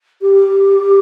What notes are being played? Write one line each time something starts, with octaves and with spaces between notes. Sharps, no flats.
G4